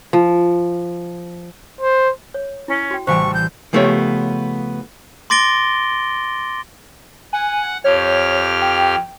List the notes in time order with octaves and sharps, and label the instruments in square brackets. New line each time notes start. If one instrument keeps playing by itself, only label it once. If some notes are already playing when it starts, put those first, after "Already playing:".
[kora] F3
[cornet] C5
[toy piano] C#5
[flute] C#4 [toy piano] E4
[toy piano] F#4 G5
[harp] A1 E3 G3 [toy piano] C5 F5 G#5 [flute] C#6
[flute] G6
[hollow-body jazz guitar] C#3 F3 A3 B3 G4 C#5
[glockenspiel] C6 D6 A6 A#6 D7 G7
[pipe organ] F#5 [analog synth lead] G#5
[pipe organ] F2 G4 F6 [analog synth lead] C#5
[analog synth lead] G5